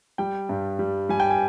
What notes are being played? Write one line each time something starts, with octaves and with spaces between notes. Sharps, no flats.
G3 G5
G2
G3
G3 G#5
G5
G#5